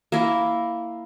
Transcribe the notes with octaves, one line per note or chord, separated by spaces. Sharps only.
A#3 E4